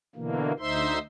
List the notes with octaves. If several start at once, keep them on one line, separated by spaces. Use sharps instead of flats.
B2 D3 E3 A#3
D2 D#4 C5 E5 C6